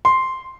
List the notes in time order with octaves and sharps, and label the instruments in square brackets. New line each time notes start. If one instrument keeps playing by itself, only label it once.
[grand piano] C6